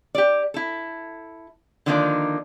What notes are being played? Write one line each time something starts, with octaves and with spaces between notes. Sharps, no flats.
G4 D5
E4 A4
D3 D#3 F3 A#3 D4 D#4